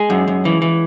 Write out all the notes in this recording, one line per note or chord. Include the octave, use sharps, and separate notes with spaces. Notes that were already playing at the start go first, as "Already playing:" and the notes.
Already playing: G#3 G#4
F#2
F#2
E3
E3